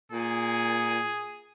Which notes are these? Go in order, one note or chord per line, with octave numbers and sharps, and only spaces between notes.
A#2 G#4